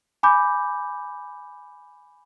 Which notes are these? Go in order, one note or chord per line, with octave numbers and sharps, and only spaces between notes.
G#5 B5 D6 G6